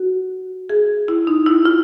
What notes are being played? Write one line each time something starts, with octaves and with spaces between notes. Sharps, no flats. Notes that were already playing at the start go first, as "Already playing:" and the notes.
Already playing: F#4
G#4
E4
D#4
E4
F4